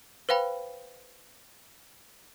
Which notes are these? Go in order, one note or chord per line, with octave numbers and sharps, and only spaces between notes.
B4 C5 F5 G5 B5